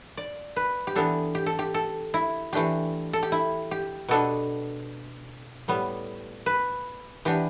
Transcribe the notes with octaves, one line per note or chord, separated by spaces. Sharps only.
D5
B4
G4
E3 B3 D4 A4
G4
A4
G4
A4
E4
E3 A3 D4 G4
A4
G4
E4
G4
B2 B3 D4 A4
A2 G3 B3
B4
E3 B3 D4 G4